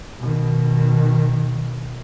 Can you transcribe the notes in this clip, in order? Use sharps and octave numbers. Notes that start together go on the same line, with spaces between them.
B2 D#3